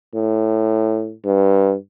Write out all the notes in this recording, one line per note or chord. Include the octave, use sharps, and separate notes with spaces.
A2
G2